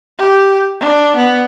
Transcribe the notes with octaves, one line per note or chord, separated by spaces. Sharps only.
G4
D4
B3